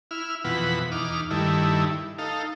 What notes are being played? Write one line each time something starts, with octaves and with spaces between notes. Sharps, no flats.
E4 F6
F2 B2 E3 F#5 B5
E2 D#4 D6 F6
G2 D#3 A3 E4
D#4 A4 F5